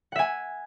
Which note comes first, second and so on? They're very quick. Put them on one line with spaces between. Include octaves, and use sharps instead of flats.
F#5 E5 G#5